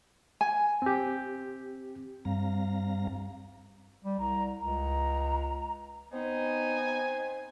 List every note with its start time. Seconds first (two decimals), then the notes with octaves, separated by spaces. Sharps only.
0.41 G#5
0.82 C4 G4
2.25 G2 G3 C4 F5 A#5 A#6
4.04 G3
4.20 C2 A#5
4.59 C#2 A#5
6.13 B3 C4 D#4 G#5